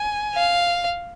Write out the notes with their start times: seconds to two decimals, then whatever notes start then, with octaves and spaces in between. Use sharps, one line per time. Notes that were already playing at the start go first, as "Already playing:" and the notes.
Already playing: G#5
0.35 F5